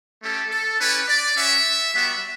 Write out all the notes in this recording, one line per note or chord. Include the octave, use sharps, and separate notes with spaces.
A3 C#4 G4 A4
A4
C#4 E4 G4 B4
D5
C#4 F#4 E5
G3 B3 F#4 E5